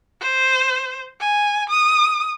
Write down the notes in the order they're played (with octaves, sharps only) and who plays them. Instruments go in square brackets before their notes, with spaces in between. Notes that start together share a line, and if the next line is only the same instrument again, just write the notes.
[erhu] C5
G#5
D#6